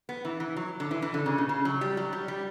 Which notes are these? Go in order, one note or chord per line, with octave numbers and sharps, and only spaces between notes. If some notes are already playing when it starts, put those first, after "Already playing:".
B3
E3
E3
F#3
D3
E3
E3
D3
C#3
B2
C#3
F#3
G3
F#3
G3
G3